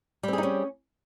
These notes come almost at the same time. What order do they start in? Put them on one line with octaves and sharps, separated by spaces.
G3 C4 G#4 D#4 C#4